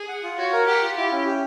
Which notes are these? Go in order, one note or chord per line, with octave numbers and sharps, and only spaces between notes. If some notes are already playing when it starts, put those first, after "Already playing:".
Already playing: G#4
F#5
F4
F#4 C#5
A#4
G4 F#5
F4
E4 G4
C#4
G4